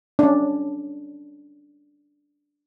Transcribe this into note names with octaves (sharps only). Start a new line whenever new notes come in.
C#4 D4